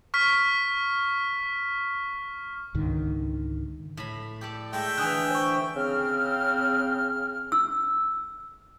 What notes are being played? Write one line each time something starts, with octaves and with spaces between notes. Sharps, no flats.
C#6 F6 B6
C#2 G#2 D3 D#3
A2 B5
G4 A4 D5
G#3 A3 E5 G5
D3 E3 G#5 D#6 F#6
C5 C#6
C#3 C4 F6
E6